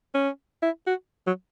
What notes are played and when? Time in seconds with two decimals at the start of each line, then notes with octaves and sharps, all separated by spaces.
0.15 C#4
0.63 E4
0.87 F#4
1.27 F#3